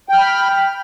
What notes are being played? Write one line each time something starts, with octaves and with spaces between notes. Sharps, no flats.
G5 B5 F6